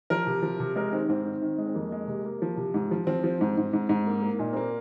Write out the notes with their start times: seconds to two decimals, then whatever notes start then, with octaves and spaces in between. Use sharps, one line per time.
0.10 F3 A#4
0.27 C3
0.42 F3
0.60 C3
0.76 G#3 A#4
0.92 D#3 C4
1.00 D#4
1.09 G#2 C4
1.25 D#3
1.42 D#3
1.58 G#3
1.67 C4
1.75 F2 A#3
1.92 G#3
2.08 C3
2.24 A#3
2.42 F3
2.57 C3
2.74 G#2
2.91 F3
3.07 F3 C4
3.24 F3
3.41 G#2
3.57 G#2
3.73 G#2
3.89 G#2
4.07 A#3
4.23 A#3
4.39 A#2 D#4
4.53 A#3 C4